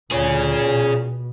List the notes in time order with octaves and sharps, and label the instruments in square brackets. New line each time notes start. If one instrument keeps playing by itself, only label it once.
[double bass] D2 [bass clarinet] A#2 [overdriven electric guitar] G#4 C#5
[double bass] B2